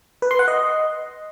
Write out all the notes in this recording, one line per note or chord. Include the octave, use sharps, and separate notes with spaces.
B4
C6
F#5
D#5